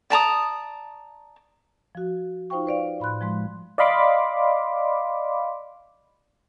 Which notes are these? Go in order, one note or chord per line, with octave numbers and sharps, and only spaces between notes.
D5 A5 A#5 D#6
F3 F#4
D#4 F4 C5 F5 G5 C#6
B4 C5 D5 F5
A2 B5 C6 F#6
F3 G#3 C6
D5 D#5 F5 B5 C6 D6